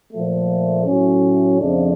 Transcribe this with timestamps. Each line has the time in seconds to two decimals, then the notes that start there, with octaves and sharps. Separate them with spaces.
0.13 A#2 F3 A3
0.86 A2 F#3 A3 C#4
1.60 F2 C#3 F3 A3 D4